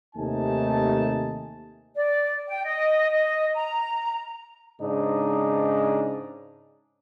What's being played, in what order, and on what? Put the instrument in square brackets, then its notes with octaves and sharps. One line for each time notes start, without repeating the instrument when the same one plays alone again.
[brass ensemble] D#2 C3 A3 D#4 G#5 A5
[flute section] D5
G5
D#5
D#5
A#5
[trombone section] G#2 C#3 D4 D#4